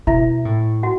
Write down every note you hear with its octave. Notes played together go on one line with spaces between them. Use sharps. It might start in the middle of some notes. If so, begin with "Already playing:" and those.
B2 E4 E5
A2
F#4 F#5